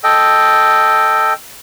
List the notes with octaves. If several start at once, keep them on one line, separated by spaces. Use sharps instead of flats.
A4 D#5 G5